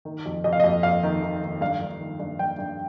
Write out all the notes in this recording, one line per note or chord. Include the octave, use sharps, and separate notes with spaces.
D#3
F2
F2 D#5
F5
D#5
F2
F2 F5
D#3
D#3
D#3
G2 F5
G2
D#3
G2
G2 G5
G2